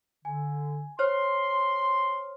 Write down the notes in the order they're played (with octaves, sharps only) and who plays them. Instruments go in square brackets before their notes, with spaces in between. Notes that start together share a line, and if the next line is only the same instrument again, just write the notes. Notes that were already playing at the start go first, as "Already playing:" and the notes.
[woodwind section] D3 [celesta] G#5
[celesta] C5 C#5 F6 [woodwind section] C6